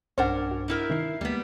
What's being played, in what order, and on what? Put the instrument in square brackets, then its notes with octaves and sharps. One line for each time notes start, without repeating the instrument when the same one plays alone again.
[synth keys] B1 G2 [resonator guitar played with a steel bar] C#4 D4 A#4 [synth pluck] C5 F#5
[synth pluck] F#4
[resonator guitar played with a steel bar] D#4 E4 A#4
[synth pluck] C3 D#3 F#6 [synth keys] E5 C7
[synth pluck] D#2 [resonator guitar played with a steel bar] G3 B3 [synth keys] G#3 A#3 B6